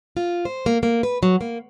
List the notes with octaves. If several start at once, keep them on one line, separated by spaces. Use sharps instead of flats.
F4
C5
A#3
A#3
B4
F#3
A#3